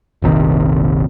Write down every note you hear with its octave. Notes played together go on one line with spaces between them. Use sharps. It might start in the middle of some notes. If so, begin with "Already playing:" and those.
F1 A#1 C3 D#3